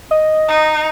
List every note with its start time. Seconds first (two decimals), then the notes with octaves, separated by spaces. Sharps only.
0.11 D#5
0.48 D#4